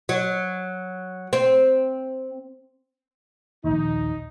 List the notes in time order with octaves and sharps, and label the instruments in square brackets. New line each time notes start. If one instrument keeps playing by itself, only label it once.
[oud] F#3
C4
[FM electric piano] A#1 D#2 [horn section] D#4